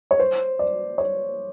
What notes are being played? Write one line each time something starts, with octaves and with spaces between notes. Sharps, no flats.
C#5
C5
D5
C#5